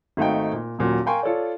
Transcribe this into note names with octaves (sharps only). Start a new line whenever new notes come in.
G#1 A3 D#4 F#4 F5 G5
A#2
D#1 A#2 F#3
A#4 F5 G5 G#5 C6 C#6
F4 A4 C#5 D5